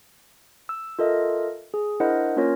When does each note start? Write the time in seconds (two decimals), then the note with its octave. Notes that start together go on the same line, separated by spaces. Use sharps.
0.69 E6
0.99 F4 A4 A#4 D#5 E5
1.74 G#4
2.00 D4 E4 A#4 C5 D#5 F#5
2.37 A#3 C#4 F4 A#4 C#5 A#6